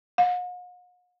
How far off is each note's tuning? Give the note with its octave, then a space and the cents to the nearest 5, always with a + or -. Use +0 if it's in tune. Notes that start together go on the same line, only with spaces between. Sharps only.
F#5 -45